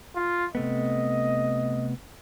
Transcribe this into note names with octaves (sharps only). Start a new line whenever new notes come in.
F4
C3 A3 B3 D#5